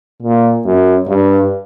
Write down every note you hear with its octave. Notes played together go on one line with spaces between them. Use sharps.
A#2
F#2
G2